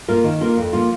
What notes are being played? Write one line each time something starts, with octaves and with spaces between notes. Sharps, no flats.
A#3 F4 A#4
D#3
A#3 F4 A#4
F2
F3 A#3 F4